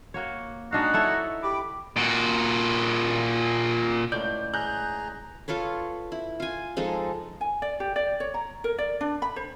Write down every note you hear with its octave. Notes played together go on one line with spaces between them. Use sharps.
A#3 F#4 C#5
G#3 D4 D#4 F#4 F5
E4 A4 C#5
G4 B5 D6
A#2 F#4
C#2 A2 D5 G6
G#4 A#5 F#6 G6
F4 A4 B4 C#5
E4
F4 G#5
F3 G#3 D#4 A4
G#5
D5
G4
D5
C#5
A#5
A#4
D5
D4
B5
C5